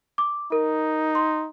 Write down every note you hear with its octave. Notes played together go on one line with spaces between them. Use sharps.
D6
D#4 A#4
C6